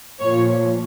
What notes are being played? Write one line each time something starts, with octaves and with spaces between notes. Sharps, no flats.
A#2 F3 C#5